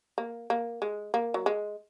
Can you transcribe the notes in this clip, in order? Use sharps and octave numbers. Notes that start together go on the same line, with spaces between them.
A#3
A#3
G#3
A#3
F#3
G#3